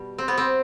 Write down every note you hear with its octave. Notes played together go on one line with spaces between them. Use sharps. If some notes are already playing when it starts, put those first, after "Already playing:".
Already playing: B2 G3
C4
B3
C4